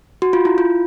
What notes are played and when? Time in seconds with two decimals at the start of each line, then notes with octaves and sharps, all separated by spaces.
0.22 F#4
0.33 F4
0.45 E4
0.58 F4